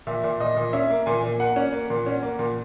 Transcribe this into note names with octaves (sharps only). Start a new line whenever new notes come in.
A#2 E5
A#2
A#2 D#5
A#2
C#4 E5
A#3
A#2 G#5
A#2
A#3 F#5
C#4
A#3
A#2
C#4
A#3
A#2